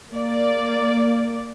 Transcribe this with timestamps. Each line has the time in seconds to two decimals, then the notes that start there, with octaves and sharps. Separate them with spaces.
0.12 A#3 D5